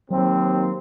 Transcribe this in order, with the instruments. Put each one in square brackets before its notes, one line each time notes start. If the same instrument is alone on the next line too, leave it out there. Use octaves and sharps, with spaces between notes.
[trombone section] D#2 C4 [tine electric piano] F#3